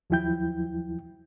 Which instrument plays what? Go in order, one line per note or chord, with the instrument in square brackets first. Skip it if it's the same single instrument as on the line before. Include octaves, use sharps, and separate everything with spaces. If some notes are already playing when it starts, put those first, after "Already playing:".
[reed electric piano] D#2 F3 F#3 E4 G5 G6